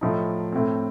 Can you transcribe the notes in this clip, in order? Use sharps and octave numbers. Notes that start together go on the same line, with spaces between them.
A2 F3 A3 D#4
A2 A3 C4